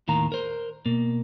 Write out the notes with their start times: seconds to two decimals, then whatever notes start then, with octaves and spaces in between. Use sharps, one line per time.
0.08 D#2 A2 D#3 F5 A#5
0.32 A#4 C5
0.86 B2 A#3